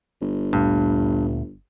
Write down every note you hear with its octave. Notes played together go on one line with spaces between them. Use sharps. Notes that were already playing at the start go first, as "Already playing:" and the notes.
G1
D2 G2 A#2 A3